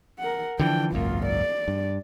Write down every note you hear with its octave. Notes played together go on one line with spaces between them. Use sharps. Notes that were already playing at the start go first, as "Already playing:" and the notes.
A#4 F#5
D3 E3 F3 D4 G5
G#1 C#2 F#2 A#3 F4
D5
G2